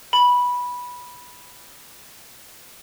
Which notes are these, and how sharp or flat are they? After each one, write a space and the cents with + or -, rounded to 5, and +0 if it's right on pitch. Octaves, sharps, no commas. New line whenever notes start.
B5 -10